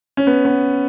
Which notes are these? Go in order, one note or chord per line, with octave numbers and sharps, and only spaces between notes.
C#4
B3
B3